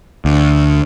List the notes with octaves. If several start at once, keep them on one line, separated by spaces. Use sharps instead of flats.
D2